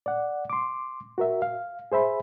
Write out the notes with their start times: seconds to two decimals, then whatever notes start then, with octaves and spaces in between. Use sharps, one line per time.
0.06 D5 F#5
0.50 C6 D6
1.18 F#4 A#4 E5
1.42 F5
1.92 G#4 C5 E5 B5